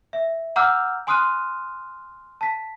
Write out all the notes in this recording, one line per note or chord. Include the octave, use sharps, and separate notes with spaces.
E5
F#5 A#5 D6 E6 F6 G6
G#5 C6 D#6 F6 F#6 D#7
A5 B6